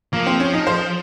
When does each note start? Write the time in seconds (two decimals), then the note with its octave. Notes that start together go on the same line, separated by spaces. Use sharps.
0.13 F3 A#3
0.26 C4
0.40 C#4
0.53 D#4
0.67 C5